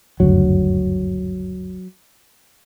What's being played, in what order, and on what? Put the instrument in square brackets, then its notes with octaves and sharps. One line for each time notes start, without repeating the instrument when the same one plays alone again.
[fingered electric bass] F#1 D2 G2 [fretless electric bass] F#3